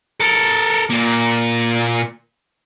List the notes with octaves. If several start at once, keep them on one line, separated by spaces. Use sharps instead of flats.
A4 A#4
A#2 A#3